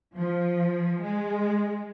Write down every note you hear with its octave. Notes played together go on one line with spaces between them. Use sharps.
F3
G#3